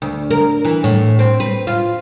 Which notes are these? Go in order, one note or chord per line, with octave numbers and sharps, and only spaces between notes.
D2
A#4
E3
A2
C4
B4
F4